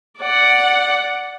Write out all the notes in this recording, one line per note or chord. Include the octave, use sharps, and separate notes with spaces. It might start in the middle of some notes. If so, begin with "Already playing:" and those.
D5 F#5